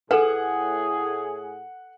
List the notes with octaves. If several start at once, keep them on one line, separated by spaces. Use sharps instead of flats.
A2 G#4 A4 B4 F#5